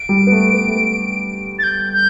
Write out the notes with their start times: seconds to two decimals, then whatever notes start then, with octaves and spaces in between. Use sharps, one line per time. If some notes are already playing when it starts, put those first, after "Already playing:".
Already playing: D7
0.09 G3
0.27 B3
0.32 A3
0.54 B3
0.67 A3
0.76 B3
1.59 A6
1.63 G6
1.93 G6